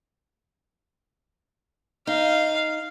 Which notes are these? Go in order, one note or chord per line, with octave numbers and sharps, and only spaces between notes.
D#4 F5